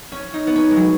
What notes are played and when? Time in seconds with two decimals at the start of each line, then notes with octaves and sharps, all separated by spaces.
0.12 C#4
0.34 D#4
0.47 B3
0.56 C#4
0.71 G#3
0.76 F#3